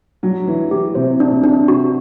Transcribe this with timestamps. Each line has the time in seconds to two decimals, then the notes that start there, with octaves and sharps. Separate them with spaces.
0.23 F#3 D4
0.47 E3 D4
0.71 E3 G4
0.95 C3 C5
1.20 D4
1.32 C3
1.44 D4
1.68 F#4